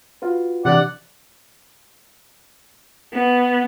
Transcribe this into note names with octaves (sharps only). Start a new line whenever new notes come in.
F4 F#4 B4
C3 E3 D4 D5 F#5
B3